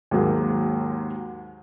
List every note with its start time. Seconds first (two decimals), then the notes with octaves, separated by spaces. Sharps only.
0.11 D#2 G#2 F#3 A#3